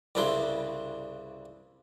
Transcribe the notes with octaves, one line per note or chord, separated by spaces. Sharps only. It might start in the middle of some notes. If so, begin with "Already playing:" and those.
C2 G2 C#3 D4 E4 C6